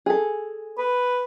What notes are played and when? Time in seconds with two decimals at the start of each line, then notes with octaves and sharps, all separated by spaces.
0.06 G#4 A4
0.78 B4